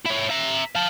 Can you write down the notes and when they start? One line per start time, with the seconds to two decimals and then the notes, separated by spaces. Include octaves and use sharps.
0.06 E4 C#5
0.30 E5 A#5
0.75 F5 A5